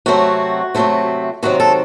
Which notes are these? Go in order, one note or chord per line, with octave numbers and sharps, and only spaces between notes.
C3 F#3 A3 C4 F#4
C3 F#3 A3 C4
C3 D#3 F#3 C4 F#4
A4